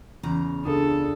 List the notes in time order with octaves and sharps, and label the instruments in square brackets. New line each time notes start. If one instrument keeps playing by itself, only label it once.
[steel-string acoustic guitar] E2 C#3 A#5
[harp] C#2 D4 D#6 [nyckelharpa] A4